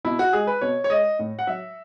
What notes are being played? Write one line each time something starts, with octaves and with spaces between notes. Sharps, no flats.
B2 E4
F#4
G#3 G#4
B4
B2 C#5
C#5
G#3 D#5
A2
F#5
F#3 E5